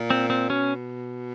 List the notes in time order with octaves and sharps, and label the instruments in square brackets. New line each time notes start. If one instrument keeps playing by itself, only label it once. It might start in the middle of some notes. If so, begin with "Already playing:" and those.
Already playing: [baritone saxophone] A#2
[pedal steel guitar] C4
C4
[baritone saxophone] B2 [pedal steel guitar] C#4